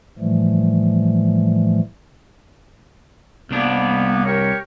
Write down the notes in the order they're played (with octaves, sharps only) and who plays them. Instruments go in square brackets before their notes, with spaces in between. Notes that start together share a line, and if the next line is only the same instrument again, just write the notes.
[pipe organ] A2 E3 F3 G3 A3
[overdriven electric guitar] C2 D4 [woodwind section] G3 A#3 B3
[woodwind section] G4 A#4 C#5